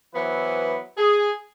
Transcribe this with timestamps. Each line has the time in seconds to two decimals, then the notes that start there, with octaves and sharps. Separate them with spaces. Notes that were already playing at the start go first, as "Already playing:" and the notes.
0.14 E3 F#3 B3 B4 C5
0.98 G#4